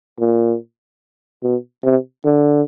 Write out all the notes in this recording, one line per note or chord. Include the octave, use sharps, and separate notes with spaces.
A#2
B2
C3
D3